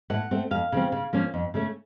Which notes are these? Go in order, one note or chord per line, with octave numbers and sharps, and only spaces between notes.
A2 F#5
A3 C4
F2 F5
C#3 F3 C4
C#3
F3 A#3 C#4
F2
C#3 A3 C#4